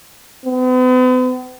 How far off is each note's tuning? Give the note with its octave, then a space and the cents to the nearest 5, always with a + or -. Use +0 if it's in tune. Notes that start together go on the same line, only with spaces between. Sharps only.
B3 +45